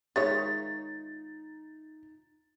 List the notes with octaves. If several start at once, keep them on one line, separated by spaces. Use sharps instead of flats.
D#3 G#3 D#4 F4 C#5 E5 A6